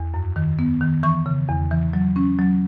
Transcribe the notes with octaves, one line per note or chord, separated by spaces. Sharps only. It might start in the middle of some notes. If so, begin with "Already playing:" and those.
Already playing: E2
F#2
D#3
B3
D#3
E3 C#6
C#3
E2
E3
F#3
C#4
F#3